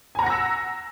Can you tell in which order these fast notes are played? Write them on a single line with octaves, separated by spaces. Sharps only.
G#5 A#5 F#5 A#6 E6